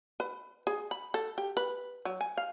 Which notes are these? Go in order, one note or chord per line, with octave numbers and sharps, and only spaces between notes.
B4
G#4
B5
A4
G4
B4
F#3
G#5
F5